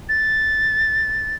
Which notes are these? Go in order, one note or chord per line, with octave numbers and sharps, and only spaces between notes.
A6